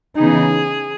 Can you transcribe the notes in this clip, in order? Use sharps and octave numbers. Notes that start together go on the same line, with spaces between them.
C#3 E3 B3 D#4 G#4